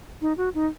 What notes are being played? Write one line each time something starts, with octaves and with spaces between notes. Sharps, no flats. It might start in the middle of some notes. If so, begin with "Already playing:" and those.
D#4
F#4
D#4